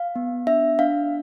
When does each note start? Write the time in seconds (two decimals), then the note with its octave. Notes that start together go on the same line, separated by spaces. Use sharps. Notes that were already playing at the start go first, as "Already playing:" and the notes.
Already playing: F5
0.16 B3
0.47 D4 E5
0.79 D4 F5